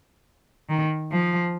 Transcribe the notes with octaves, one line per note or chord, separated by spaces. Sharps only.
D#3
F3